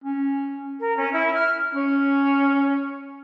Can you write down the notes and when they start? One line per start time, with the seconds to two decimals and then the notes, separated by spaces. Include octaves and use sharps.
0.04 C#4
0.80 A#4
0.97 C#4
1.13 E4
1.34 F6
1.74 C#4